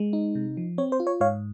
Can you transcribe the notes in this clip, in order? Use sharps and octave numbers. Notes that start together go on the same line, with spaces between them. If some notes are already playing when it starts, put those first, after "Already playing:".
Already playing: G#3
D#4
C3
F3
C4 C#5
C5
F4
C#5
G#2 C#5 F5